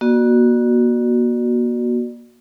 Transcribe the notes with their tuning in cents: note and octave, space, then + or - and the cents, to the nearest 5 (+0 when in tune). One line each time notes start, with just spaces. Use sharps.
A#3 +45 F#4 +0 D5 +30